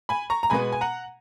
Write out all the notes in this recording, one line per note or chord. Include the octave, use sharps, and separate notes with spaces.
G#5 B5
A#5 C#6
A#5
B2 G#3 B3 G#5 B5
G#5
F#5 A#5